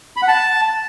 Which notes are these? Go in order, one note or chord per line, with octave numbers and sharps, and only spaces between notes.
B5
F#5
A5